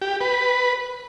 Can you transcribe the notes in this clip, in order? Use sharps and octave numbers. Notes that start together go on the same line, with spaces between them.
G4
B4